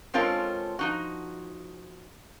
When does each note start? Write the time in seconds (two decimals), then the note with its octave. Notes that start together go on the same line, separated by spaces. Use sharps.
0.14 G#3 C4 C#4 F4 A4 A#4
0.79 F3 D#4 F#4